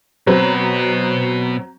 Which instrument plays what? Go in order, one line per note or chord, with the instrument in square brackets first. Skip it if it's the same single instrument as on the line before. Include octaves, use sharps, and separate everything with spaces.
[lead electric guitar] B2 B4 [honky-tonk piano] F#3 C4